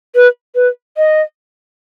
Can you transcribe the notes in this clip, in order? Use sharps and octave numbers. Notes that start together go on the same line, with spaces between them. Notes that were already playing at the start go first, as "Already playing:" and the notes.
B4
B4
D#5